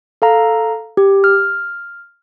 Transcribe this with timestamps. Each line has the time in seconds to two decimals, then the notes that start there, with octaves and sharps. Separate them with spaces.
0.22 A4 F5 A#5
0.97 G4
1.24 F6